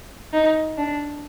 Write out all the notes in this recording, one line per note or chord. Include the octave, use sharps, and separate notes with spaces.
D#4
D4